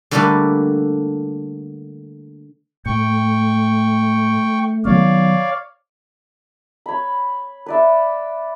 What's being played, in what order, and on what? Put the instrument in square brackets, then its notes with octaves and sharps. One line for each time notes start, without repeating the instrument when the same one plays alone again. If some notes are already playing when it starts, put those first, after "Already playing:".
[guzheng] D3 G3 A3 A#3 G4 B4
[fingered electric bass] A2 [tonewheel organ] A3 [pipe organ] G5 C#6
[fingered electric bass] D#3 F#3 B3 [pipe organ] C#5 D5 F5
[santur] C#5 B5
B4 D5 E5